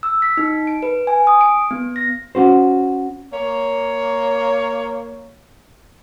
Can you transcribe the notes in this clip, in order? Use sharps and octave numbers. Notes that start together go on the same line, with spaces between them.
E6
B6
D#4
D7
B4
G#5
D#6
D7
B3
A#6
C#4 F#4 C5
A#3 C#5